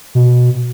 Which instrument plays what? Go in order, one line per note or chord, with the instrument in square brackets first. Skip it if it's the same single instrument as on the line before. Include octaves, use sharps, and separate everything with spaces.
[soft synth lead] B2